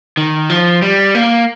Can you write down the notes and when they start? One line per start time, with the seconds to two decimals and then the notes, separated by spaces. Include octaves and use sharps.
0.17 D#3
0.50 F3
0.82 G3
1.15 A#3